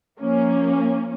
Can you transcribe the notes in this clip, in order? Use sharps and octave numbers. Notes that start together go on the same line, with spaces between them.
F3 A#3 C#4